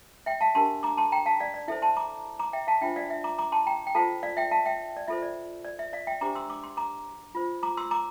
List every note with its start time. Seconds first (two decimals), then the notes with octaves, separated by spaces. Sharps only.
0.26 E5 G5
0.41 F5 A5
0.55 D4 G4 A#4 A5 C6
0.83 A#5 D6
0.97 A5 C6
1.12 G5 A#5
1.26 F5 A5
1.40 D5 F5
1.54 D5
1.68 E4 A4 C5 E5
1.82 A5 C6
1.97 A#5 D6
2.39 A#5 D6
2.53 E5 G5
2.67 F5 A5
2.81 D4 F4 C5 E5 G5
2.96 D5 F5
3.10 E5
3.24 A#5 D6
3.38 A#5 D6
3.52 A5 C6
3.67 G5 A#5
3.87 G5
3.95 F4 A4 C5 F5 A5
4.23 D5 F5
4.37 E5 G5
4.51 F5 A5
4.66 E5 G5
4.97 D5
5.08 F4 A4 C5 E5
5.22 D5
5.65 D5
5.79 E5
5.93 D5 F5
6.07 E5 G5
6.21 D4 G4 C5 A#5 D6
6.35 C6 E6
6.50 D6
6.63 C6
6.77 A#5 D6
7.35 F4 C5
7.63 A#5 D6
7.77 C6 E6
7.91 A#5 D6